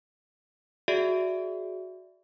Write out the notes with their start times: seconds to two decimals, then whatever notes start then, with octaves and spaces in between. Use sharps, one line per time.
0.88 F#4 G#4 D5 E5